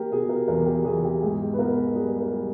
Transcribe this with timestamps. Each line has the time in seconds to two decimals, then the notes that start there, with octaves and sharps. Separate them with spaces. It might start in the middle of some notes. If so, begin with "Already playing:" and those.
Already playing: A#3 G4 A#4
0.11 B2 G#4
0.29 A#4
0.48 E2 A#4
0.66 G4
0.84 E2 G#4
1.04 G4
1.22 G#2 G#4
1.53 B4
1.59 B3 A#4
1.95 G3 G#4
2.20 A#4
2.32 G3